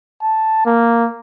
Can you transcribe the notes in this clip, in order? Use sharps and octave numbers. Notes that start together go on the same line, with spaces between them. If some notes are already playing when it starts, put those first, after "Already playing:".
A5
A#3